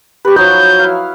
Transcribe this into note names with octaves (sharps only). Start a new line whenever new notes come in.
G4 B4 C#6
F3 F#3 D#4 G6
E4 F5